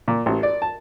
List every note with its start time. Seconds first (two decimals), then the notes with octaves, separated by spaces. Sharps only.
0.08 A#2
0.26 A1
0.43 D5
0.62 A5